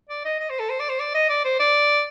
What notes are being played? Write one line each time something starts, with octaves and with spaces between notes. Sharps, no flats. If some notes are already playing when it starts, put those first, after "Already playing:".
D5
D#5
D#5
C5
A4
C5
D5
C5
D5
D#5
D5
C5
D5